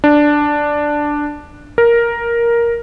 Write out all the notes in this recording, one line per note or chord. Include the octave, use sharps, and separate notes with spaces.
D4
A#4